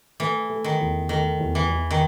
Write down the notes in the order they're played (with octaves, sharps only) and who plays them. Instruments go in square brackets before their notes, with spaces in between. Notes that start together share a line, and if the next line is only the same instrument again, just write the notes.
[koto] E3 [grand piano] A3
[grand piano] A3
[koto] D#3
[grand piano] E2
[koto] D#3 [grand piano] A3
[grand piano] E2
[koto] E3
[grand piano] E2
[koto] D#3